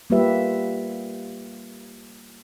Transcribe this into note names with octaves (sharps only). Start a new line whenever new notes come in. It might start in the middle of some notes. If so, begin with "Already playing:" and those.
G3 A#3 F4 G4 B4 E5